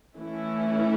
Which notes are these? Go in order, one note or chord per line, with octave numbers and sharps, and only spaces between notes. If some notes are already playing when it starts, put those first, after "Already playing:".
E3 A3 C#4 E4